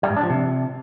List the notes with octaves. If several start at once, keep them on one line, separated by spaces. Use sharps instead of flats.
G3
G#2
D4
F3
C3